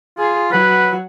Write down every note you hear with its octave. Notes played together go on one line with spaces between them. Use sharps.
F4 G#4
F#3 F#4 B4